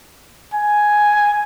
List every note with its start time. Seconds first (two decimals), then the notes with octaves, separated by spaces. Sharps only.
0.54 G#5